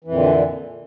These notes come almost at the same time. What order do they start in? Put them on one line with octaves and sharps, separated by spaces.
E3 F2 A#2 D3